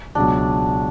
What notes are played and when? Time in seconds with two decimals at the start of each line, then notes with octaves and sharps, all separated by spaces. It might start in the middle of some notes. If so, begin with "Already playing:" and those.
0.15 C#2 B2 F#3 D4